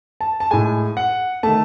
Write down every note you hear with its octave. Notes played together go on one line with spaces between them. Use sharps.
A5
A5
A2 G#3 G#5
F#5
D#3 A3 A5